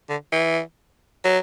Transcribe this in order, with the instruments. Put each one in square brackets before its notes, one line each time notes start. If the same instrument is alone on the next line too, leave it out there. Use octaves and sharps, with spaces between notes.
[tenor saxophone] D3
E3
F#3